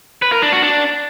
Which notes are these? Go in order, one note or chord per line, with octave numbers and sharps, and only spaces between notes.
B4
A#4
D4
F#4
D4